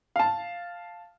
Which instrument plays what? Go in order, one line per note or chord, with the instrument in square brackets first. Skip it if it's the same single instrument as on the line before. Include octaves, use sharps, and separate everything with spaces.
[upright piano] F5 A5